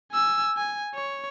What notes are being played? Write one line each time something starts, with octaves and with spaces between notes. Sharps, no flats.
G#5 E6
G#5
C#5